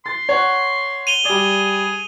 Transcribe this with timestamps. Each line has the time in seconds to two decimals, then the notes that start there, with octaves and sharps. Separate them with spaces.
0.06 C6 A6
0.29 C#5 F#5
1.07 D#7 F7 G7
1.25 G3 G#4 D5